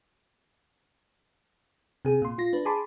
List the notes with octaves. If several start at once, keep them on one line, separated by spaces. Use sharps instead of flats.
C3 G#4
A#2 C6
F4 A#6
D4 B4
G#4 G#5 A5 B5 C6 D6